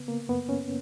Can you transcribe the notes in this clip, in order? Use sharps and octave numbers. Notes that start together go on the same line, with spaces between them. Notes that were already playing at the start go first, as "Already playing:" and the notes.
Already playing: C#3 B3
A#3
F#2 B3
C#4